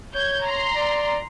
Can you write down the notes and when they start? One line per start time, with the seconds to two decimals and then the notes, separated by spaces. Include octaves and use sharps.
0.15 C#5 G6 G#6
0.46 A#5 C6
0.75 D5